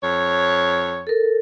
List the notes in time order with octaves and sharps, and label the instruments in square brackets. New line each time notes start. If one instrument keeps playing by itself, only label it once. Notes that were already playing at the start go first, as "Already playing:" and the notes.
[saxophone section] F2 C#5
[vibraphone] A4 A#4